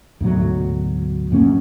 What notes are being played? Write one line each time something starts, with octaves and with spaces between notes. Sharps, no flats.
D2 G#2 B2 F#3
D#1 F#2 A#3 C#4